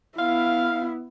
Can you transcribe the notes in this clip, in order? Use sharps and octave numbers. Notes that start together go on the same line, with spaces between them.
B3 E4 F5